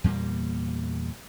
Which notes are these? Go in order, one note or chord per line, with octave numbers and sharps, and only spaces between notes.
E2 A#2 G3 A#3